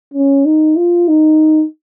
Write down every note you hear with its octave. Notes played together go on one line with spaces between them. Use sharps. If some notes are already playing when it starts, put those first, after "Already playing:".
C#4
D#4
F4
D#4